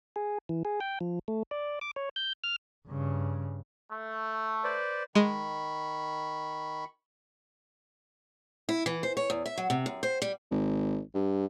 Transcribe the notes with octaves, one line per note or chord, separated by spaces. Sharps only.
G#4
E3
G#4
G5
F3
A3
D5
D6
C#5
G6
F6
G2 C#3
A3
B4 C5 D5
D#3 G#3 B5 C#6
E4
E3
C5
C#5
E2
E5
F#3
C3
F#2
C5
G3
G#1
G2